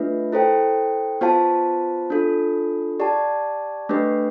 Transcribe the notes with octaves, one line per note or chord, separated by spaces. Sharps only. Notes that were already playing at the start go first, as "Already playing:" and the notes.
Already playing: A3 D4 F4 B4 E5
E4 A4 C5 G5
B3 F4 C5 F5 A5
D4 F4 A4
G4 D5 A5
A3 D4 G4 B4